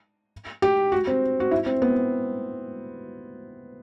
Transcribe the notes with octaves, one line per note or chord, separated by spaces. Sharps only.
G4
F#4
C4
F#4
E4
C4
B3